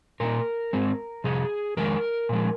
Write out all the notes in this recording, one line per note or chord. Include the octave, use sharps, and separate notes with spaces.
A#2 A#3 D#4 A#4
G#2 G#3 C4
F2 C3 G#4
F2 D#3 G#3 D#4 A#4
A#2 F3 G#3